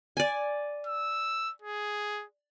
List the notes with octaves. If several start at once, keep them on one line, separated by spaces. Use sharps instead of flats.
D5 G#5
E6
G#4